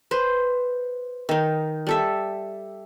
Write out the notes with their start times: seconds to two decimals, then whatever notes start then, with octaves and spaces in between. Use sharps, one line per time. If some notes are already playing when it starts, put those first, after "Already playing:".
0.11 B4 C5
1.29 D#3 D#4
1.87 G3 A4 E5